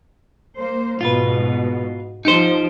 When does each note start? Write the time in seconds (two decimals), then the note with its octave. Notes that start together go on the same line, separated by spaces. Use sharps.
0.56 A#3 C5
1.01 G#2 B2 F4 B4
2.25 F3 D#4 G4 C5